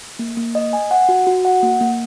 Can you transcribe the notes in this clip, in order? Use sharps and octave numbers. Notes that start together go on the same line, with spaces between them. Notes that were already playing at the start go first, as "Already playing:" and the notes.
A#3
A#3
D#5
G#5
F#5
F#4
F#4
F#5
A#3
A#3